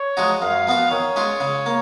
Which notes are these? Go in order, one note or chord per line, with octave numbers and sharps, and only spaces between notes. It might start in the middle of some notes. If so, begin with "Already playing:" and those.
Already playing: C#5
F3 G#3 D#4 F#4
F#2 F5
F3 B3 F#4
D#3 C#5
G#3 C#4 F4
C#3
A#3